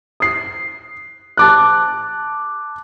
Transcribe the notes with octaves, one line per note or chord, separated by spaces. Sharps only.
D#6 C7
A5 D6 F#6